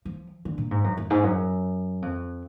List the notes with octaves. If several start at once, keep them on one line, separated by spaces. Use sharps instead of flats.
F3
D3
A#2
G#2
F#2
F#2
G#2
F#2
F2